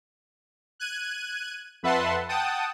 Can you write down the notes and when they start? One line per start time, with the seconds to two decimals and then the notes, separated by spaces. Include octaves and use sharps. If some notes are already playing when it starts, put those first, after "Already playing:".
0.80 F#6 G#6 D#7
1.83 F2 B4 E5 F#5 A5 C6
2.29 F#5 G5 A5 D#6